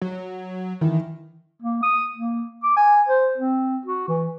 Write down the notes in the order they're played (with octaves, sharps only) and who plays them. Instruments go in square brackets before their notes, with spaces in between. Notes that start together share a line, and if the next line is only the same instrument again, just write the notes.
[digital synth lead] F#3
[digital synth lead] D#3 [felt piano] E3
[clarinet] A#3
D#6
A#3
D6
G#5
C5
C4
F#4
E3